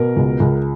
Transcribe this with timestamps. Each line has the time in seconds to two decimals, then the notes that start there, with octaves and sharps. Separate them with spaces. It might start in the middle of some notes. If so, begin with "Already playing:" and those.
Already playing: B2 A#4
0.17 C#2
0.40 C#2